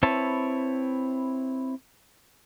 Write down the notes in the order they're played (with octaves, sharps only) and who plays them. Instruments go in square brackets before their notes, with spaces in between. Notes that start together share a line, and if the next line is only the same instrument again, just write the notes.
[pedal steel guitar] C4 E4 B4 C#5 A5